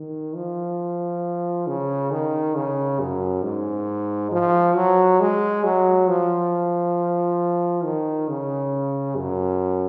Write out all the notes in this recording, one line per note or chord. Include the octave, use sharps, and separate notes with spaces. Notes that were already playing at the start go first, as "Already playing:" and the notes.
Already playing: D#3
F3
C#3
D#3
C#3
F#2
G#2
F3
F#3
G#3
F#3
F3
D#3
C#3
F#2